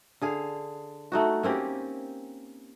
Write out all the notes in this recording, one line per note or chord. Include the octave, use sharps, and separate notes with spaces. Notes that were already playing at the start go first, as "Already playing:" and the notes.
D3 G#4 F5
A3 D#4 F#4
A#3 C4 C#4 G4